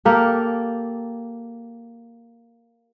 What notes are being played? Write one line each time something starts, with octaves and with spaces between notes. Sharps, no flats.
A#3 G4 A4